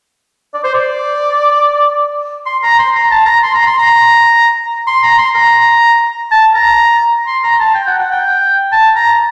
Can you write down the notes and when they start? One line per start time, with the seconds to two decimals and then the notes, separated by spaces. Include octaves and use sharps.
0.54 D5
0.64 C5
0.74 D5
2.46 C6
2.63 A#5
2.79 C6
2.95 A#5
3.11 A5
3.26 A#5
3.43 C6
3.54 A#5
3.66 C6
3.79 A#5
4.87 C6
5.03 A#5
5.18 C6
5.35 A#5
6.31 A5
6.54 A#5
7.27 C6
7.43 A#5
7.59 A5
7.75 G5
7.87 F#5
7.99 F#5
8.11 G5
8.72 A5
8.95 A#5